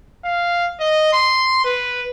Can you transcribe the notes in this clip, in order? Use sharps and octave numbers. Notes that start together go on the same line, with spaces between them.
F5
D#5
C6
B4